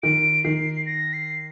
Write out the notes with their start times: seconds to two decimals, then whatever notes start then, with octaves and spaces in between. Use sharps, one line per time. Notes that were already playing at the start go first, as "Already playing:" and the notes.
0.03 D#3 D7
0.44 D#3 C7
0.86 A#6
1.13 C7